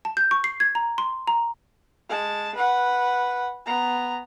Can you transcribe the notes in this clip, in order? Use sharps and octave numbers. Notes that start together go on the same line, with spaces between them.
A5
G6
C#6
C7
G#6
A#5
C6
A#5
G#3 A5
B4 F#5
B3 A#5